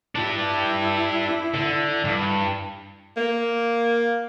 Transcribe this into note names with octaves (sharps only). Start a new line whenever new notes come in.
D4 E4 G4
D3
G2
A#3